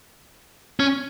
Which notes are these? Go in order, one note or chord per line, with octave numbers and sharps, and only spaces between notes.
C#4